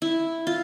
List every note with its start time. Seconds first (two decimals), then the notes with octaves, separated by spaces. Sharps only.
0.02 E4
0.47 F4